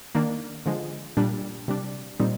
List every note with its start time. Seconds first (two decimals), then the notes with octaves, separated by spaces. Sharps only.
0.15 D#3 A#3 D4
0.66 D3 F3 G#3
1.17 A#2 G3 D4
1.68 C3 G3 D4
2.20 A#2 G3 C4 D#4